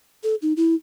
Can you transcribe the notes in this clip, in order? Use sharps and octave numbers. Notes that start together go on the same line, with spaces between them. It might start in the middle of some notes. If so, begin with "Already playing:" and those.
A4
D#4
E4